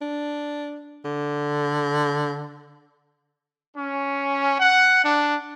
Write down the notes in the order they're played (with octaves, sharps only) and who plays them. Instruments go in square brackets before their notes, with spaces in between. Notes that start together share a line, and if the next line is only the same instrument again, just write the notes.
[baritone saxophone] D4
D3
[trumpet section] C#4
F#5
D4